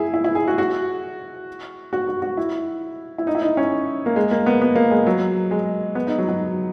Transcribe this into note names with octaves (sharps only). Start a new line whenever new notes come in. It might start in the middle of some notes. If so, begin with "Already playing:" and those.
Already playing: E4 G#4
E4
E4
G#4
F#4
F#4
F#4
F#4
F#4
E4
E4
D#4
E4
D#4
C#4
A#3
G#3
A#3
B3
B3
A#3
G#3
F#3
G#3
B3
D#4
F#3
F#3